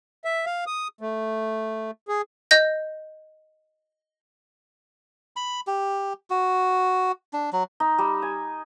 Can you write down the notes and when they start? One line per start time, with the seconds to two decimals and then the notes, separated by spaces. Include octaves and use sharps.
0.25 E5
0.46 F5
0.67 D#6
1.01 A3
2.08 G#4
2.51 D#5 G6 A#6
5.36 B5
5.67 G4
6.30 F#4
7.33 D4
7.53 F#3
7.80 D#4
7.98 G3
8.22 G#5